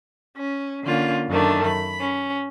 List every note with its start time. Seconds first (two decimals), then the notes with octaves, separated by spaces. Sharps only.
0.36 C#4
0.83 D3 A#3 C#4 F4
1.29 F#2 D#3 A3 D4
1.67 B5
2.00 C#4